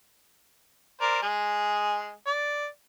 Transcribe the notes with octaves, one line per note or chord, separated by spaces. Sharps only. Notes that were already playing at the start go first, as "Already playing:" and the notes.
A#4 C5 D5
G#3 G#4
D5